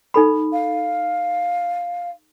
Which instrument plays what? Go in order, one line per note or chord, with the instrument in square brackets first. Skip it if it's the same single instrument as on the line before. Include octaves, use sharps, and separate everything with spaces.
[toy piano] D#4 A4 B5
[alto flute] F5